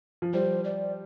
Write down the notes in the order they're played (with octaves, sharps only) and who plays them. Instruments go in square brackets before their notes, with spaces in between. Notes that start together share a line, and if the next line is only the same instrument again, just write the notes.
[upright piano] F3
[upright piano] G3 [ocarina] C5
[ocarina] D5